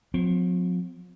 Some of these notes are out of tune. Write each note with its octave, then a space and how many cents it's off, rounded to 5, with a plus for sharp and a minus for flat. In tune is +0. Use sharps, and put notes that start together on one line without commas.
F3 +40 C4 -30